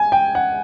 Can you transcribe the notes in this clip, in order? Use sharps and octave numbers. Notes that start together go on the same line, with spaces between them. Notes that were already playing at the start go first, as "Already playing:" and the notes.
Already playing: G#5
G5
F#5